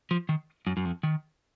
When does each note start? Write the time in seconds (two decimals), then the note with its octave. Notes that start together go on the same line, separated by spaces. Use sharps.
0.11 F3
0.29 D#3
0.67 F#2
0.77 F#2
0.85 F2
1.03 D#3